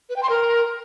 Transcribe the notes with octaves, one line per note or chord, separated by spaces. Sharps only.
B4
G5
C6
A#4